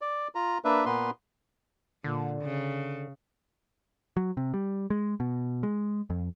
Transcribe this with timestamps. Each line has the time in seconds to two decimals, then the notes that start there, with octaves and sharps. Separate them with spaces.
0.01 D5
0.35 F4 A#5
0.65 A#3 D4 B4 E5
0.86 A#2 A#3 B3 B4 C6
2.04 A#2 D3
2.42 C#3
4.17 F#3
4.37 C3
4.54 G3
4.90 G#3
5.20 B2
5.63 G#3
6.10 F2